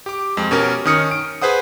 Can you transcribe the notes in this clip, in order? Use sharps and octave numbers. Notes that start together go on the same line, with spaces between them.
G4 D6
F2 G#3
B2 C#4 G4 A#4
D#3 C#4 D#6 F6 C#7
D7
G#4 B4 C5 F#5 D#6